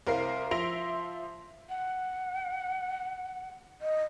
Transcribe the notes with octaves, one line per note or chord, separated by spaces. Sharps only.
C2 A#4 C5 F5 C7
F3 E5 C6 A#6 D7 F7
F#5
D#5